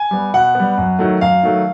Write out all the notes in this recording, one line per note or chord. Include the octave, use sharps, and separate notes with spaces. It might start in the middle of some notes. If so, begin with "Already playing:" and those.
Already playing: G#5
G3 B3
B2 F#5
G3 B3
F#2
D#3 F#3 A3
F#2 F5
D#3 F#3 A3